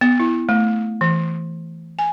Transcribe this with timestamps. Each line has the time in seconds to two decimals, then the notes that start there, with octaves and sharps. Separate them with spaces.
0.01 B3
0.20 E4
0.49 A3
1.01 E3
1.99 G#5